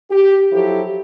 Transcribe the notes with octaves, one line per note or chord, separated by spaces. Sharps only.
G4
F3 F#3 E4 G4 A4